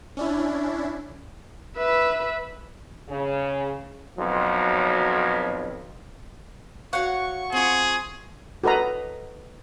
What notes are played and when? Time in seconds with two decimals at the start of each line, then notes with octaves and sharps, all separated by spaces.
0.17 C#4 D4 E4
1.77 B4 E5
3.09 C#3
4.18 B1 F2 F#3
6.93 F#4 C#5 F5 F#5 C#6
7.52 C4 F4 G#4
8.64 F#4 A4 B4 D#5 A#5